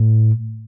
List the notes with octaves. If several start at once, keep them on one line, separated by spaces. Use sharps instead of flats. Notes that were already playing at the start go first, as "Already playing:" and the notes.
Already playing: A2